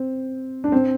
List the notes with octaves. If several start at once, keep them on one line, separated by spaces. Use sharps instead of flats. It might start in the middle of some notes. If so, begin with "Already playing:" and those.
Already playing: C4
D4
C4